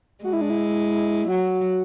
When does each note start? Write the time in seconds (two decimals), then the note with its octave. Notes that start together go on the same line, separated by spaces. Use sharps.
0.24 G#3 F#4
0.33 E4
0.41 D4
0.50 E4
1.29 F#3 F#4